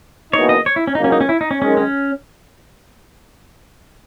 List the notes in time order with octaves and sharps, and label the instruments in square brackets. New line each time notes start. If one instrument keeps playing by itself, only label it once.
[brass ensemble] F#1 E2 B2 A#3 D#4 [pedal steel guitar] C#5
[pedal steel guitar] D#5
C#5
E4
C#4
[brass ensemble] C#2 C#3 F#3 A#3 [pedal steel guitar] D#4
[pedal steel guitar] C#4
D#4
C#4
E4
D#4
C#4
[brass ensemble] F#2 D#3 G#3 [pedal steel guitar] C#4
[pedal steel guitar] C#4